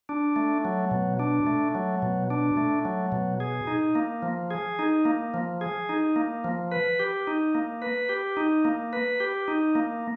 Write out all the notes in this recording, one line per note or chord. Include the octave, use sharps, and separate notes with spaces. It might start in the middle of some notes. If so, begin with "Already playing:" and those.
D4
A3
F#3
B2
D4
A3
F#3
B2
D4
A3
F#3
B2
G#4
D#4
A#3
F3
G#4
D#4
A#3
F3
G#4
D#4
A#3
F3
B4
G4
D#4
A#3
B4
G4
D#4
A#3
B4
G4
D#4
A#3